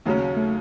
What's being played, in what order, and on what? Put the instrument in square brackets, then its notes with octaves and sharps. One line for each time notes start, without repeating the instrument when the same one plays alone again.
[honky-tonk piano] D#2 C#3 F#3 C#4 [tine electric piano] A3
[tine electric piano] A3